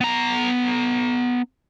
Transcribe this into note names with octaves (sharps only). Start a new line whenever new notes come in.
B3 A#5